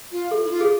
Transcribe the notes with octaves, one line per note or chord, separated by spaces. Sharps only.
F4
A4
E4
F4
G#4